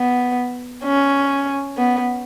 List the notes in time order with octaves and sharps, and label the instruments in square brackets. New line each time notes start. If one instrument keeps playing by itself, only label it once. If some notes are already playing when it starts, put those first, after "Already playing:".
Already playing: [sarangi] B3
C#4
B3